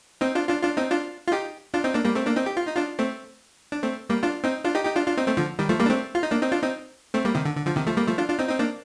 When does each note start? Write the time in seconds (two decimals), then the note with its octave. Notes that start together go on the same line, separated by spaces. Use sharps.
0.21 C4 D#4
0.35 D4 F4
0.49 D4 F4
0.63 D4 F4
0.77 C4 D#4
0.91 D4 F4
1.27 F4
1.32 D#4 G4
1.74 D4 F4
1.84 C4 D#4
1.94 A#3 D4
2.05 G3 A#3
2.15 A3 C4
2.26 A#3 D4
2.36 C4 D#4
2.46 G4
2.57 F4
2.67 D#4
2.76 D4 F4
2.99 A3 C4
3.72 D4
3.82 A3 C4
4.09 G3 A#3
4.23 D4 F4
4.44 C4 D#4
4.64 D4 F4
4.75 D#4 G4
4.85 D#4 G4
4.95 D4 F4
5.06 D4 F4
5.17 C4 D#4
5.27 A3 C4
5.37 D3 F3
5.59 D#3 G3
5.69 F3 A3
5.79 G3 A#3
5.86 D4
5.89 A3 C4
6.15 F4
6.23 D#4
6.31 A#3 D4
6.42 C4 D#4
6.52 D4 F4
6.62 C4 D#4
7.14 A3 C4
7.25 G3 A#3
7.34 C3 D#3
7.45 D3
7.56 D3
7.66 D3 F3
7.76 C3 D#3
7.87 F3 A3
7.97 G3 A#3
8.07 F3 A3
8.18 D4 F4
8.28 D4 F4
8.39 C4 D#4
8.49 C4 D#4
8.59 A#3 D4